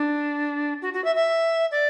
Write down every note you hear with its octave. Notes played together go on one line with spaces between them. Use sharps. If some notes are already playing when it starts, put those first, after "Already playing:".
Already playing: D4
F#4
F#4
E5
E5
D5